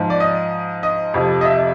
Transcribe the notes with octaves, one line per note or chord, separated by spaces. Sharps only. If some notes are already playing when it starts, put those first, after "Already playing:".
Already playing: G#2 F3
D5
D#5
D#5
F2 C3 F3
D#5
E5